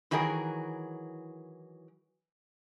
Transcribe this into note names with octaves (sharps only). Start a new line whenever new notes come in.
D#3 E3 F#3 G#4 A#4